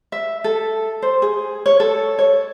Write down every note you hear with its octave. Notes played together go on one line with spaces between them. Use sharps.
E5
A4
C5
G#4
C#5
A4
C#5